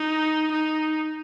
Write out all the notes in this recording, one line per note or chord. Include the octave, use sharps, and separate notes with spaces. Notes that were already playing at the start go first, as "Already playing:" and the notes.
Already playing: D#4
D#4